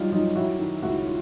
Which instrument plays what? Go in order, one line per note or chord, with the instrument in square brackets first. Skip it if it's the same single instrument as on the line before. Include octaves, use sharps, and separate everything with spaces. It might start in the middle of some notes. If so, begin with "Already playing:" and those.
Already playing: [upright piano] F#3 G3 D#4 F4
F#2 D#4 F4
F#2 E4 F#4
D#3
C#2 E4 F#4
F4